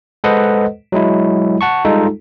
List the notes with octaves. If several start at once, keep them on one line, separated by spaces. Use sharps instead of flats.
G#3 A4 B4 C5 D#5 F#5
F#3 G#3 E4
F#5 A5 C#6
G3 G#3 D#4 F4 A4